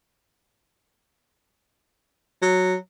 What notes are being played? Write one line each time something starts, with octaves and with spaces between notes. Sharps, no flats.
F#3